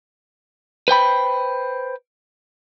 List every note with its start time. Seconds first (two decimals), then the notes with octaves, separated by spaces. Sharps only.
0.88 B4 C5 G5 B5